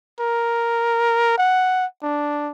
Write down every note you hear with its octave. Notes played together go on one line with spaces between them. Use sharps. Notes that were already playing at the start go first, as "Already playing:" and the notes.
A#4
F#5
D4